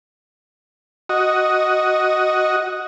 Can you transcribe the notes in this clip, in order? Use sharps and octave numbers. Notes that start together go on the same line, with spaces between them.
F#4 D#5